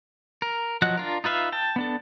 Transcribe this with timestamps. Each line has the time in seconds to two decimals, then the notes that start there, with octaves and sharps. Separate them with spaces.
0.42 A#4
0.82 F3 F#3 D#5 F#5 F#6
0.97 D4 F4 A#4
1.24 D#4 F4 B4 E5 F5
1.52 G5 A5
1.76 B3 D4 A4